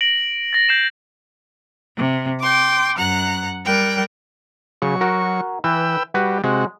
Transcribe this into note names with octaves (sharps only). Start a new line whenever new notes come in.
A#6 D7 F#7
A6 A#6
G6 C7 E7
C3
G5 C6 D6
F#2 F#5 A#5 F#6
G3 A#4 G5 F#6
C#3 F#3 C#6
F#4 A#4
E3 B4 G5 E6
G3 F#4 B4
C3 G#3 F#4